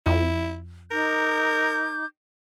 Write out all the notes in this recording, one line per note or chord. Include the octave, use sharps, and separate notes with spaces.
F2 E4
D#4 A#4 D6 G6